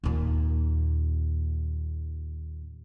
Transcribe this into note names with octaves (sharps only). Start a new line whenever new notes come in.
D#2 A#2